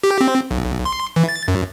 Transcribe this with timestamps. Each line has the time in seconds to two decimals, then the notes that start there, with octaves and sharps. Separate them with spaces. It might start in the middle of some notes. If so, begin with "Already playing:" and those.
0.03 G4
0.21 C4
0.51 B1
0.85 C6
1.16 E3
1.29 A6
1.48 F#2